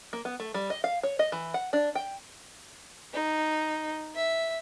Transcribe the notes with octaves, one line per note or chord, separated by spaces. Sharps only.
A#3
B3
A3
G3
D#5
F5
C#5
D#5
E3
F#5
D4
G5
D#4
E5